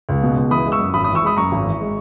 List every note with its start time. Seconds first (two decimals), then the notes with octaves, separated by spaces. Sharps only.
0.09 C#2
0.23 B2
0.37 C#2
0.51 E3 B5 D#6
0.66 G#3
0.72 C#6 E6
0.79 F#2
0.94 G#1 B5 D#6
1.04 B5 D#6
1.09 E3
1.15 C#6 E6
1.23 G#3 B5 D#6
1.36 F#2 A#5 C#6
1.52 G#1
1.65 E3
1.80 G#3